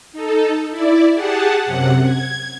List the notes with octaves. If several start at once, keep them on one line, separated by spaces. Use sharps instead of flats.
D#4 A4
E4 D5
G4 G#4 F#5 A5
F#2 C3 F#5
G#6